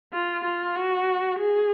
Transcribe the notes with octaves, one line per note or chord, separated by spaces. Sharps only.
F4
F4
F#4
G#4